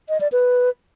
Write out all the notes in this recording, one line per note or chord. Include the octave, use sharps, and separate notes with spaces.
D#5
D5
B4